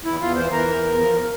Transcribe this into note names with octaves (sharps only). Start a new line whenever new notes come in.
E2 E4
E2 F4
E3 C5
E3 A#4
E2
E2
F3